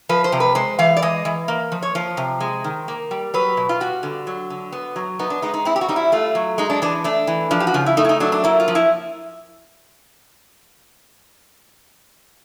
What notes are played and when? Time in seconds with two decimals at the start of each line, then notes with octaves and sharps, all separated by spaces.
0.09 F3 B4
0.24 C5
0.32 C3
0.40 B4
0.55 G#3 C5
0.79 E3 F5
0.97 D5
1.02 G#3 D#5
1.25 E3
1.48 A#3
1.72 F3
1.82 C#5
1.95 F3 C5
2.17 C3
2.40 G#3
2.64 D#3
2.88 A#3
3.11 G3
3.34 F#3 B4
3.57 B2
3.69 F4
3.81 G3 F#4
4.03 D3
4.27 F#3
4.50 D3
4.72 B3
4.96 F#3
5.19 B3 D#4
5.30 D4
5.42 G#3 D#4
5.54 D#4
5.65 C4 E4
5.76 G4
5.81 F#4
5.88 G3 D#4
5.96 E4
6.12 A3 F4
6.35 F#3
6.58 G#3 D#4
6.70 D4
6.82 E3 D4
7.04 A3 D4
7.27 E3
7.51 F3 D4
7.60 G4
7.67 F#4
7.74 C#3 F4
7.86 E4
7.97 A3 D#4
8.05 E4
8.09 D#4
8.20 F#3 D4
8.32 D4
8.44 A#3 E4
8.60 F4
8.68 F3
8.75 E4